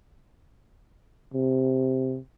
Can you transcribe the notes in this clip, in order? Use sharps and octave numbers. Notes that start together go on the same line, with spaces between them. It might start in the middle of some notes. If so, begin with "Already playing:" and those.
C3